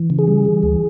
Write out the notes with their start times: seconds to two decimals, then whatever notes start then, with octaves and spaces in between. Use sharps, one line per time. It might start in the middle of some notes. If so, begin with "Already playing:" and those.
Already playing: E3
0.10 C#3
0.19 G#4
0.28 G3
0.45 E3
0.63 D2